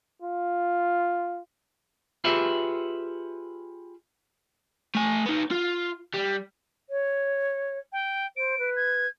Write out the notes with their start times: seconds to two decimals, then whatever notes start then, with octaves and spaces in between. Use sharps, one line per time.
0.22 F4
2.24 F4 G4 G#4 B4 C#5 E5
4.95 A3 G#5
5.26 B3 D#4
5.51 F4
6.14 G3
6.89 C#5
7.92 G5
8.37 C5 D7
8.58 B4
8.76 G#6